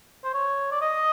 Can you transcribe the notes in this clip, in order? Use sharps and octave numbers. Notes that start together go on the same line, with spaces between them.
C5
C#5
D5
D#5